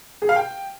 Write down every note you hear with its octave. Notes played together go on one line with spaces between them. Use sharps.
G#4
F5
G5